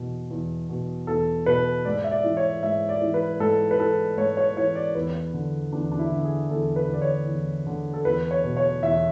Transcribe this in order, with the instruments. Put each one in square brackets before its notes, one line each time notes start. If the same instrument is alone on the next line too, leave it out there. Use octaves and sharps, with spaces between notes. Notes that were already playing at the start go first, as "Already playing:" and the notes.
Already playing: [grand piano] E2 B2
E2
B2
E2 A4
B2 B4
G#2 D5
E5
D5
E3
C#5
G#2 E5
D5
E3
B4
G#2 A4
B4
E3 A4
G#2 C#5
C#5
E3 C#5
D5
E2 B4
D3
E2 D4
D4
E4
D3
G#4
E2 A4
B4
D3
D5
C#5
E2
D3
A4
E2 B4
C#5
B2
C#5
E2 E5